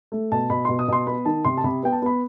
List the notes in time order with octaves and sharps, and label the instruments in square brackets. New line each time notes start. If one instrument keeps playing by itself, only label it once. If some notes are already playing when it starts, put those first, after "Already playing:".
[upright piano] A3
B2 A5
B2 B5
B2 C6
D#6
B2 C6
B3 B5
D#3 A5
C3 C6
A5
C3 B5
B3 G5
A5
B3 B5